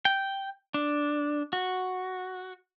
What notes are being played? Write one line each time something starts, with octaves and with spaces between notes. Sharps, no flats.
G5
D4
F#4